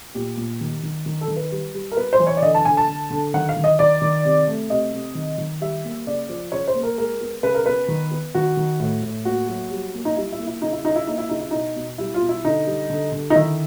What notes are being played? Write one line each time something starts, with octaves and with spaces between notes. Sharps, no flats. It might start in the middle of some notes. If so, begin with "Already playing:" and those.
A#2 G4
A#2
D#3
D#3
D#3
A4
D#3
B4
G3
G3
A#4
B3 B4
C5
E3
C#5
D5
D3 D#5
A5
D3 G#5
A5
D3
D3
D#3 F#5
F5
D#3
D#5
D#3 D5
D#3
C3
A3
C3 D#5
C3
D#3
D#3
G3 E5
A#3
C#3 D5
F3
C#3 C#5
C5
A#3
A#4
G#3 A#4
B3
C#3 B4
A#4
B3 B4
D#3
B3
D#3 F#4
D#3
A2
A2
A#3 F#4
F#3
G3
A#3
D#4
G3 E4
E4
A#3
E4
C#3 D#4
E4
C#3 D#4
E4
A#3 D#4
E4
C#3 D#4
E4
B2 D#4
B2
G3 E4
F4
B2
E4
D3 D#4
G3
D3
D3
D#4
D#3 E4